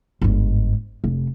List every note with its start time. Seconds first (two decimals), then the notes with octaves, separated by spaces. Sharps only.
0.22 G1 G#2
1.04 F1